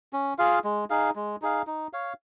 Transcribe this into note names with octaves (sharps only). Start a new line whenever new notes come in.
C#4
F4 G#4 F5
G#3
D#4 G#4 F5
G#3
D#4 G#4 F5
D#4
C#5 F5